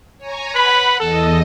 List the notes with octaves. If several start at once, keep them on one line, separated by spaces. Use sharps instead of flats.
C#5 G#5 A#5
B4 F#5 B5
E2 A4 D#5